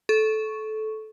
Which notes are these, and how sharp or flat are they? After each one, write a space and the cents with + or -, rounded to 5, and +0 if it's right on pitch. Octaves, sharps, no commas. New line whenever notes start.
A4 -20 C#6 +0